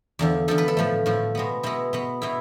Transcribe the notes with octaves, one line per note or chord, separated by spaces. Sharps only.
E2 D3 F3
E2 D3 F3 A4
B4
A4
A2 F3 A3
A2 F3 A3
B2 G#3 B3
B2 G#3 B3 E4
B2 B3
B2 B3 E4